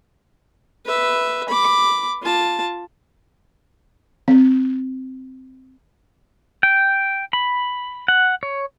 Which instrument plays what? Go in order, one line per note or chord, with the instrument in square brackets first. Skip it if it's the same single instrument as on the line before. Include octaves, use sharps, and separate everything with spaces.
[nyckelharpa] B4 E5
B5 D6
F4 A5
[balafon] C4
[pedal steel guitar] G5
B5
F#5
C#5